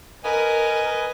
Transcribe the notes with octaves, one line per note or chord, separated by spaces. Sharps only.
A#4 B4 D#5 G#5